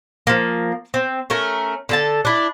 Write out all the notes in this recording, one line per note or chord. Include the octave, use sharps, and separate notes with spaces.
F3 A#3
C4
A3 C#4 A#4
D3 A4 A5
D4 E4